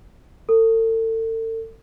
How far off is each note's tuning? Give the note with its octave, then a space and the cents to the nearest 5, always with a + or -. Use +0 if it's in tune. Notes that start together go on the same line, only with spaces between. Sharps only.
A4 +40